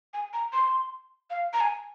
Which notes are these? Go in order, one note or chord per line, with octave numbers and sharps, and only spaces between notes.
G#5
A#5
C6
F5
A#5
G#5